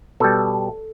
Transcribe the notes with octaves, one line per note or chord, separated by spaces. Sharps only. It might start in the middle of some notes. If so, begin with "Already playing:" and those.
B2 G3 A4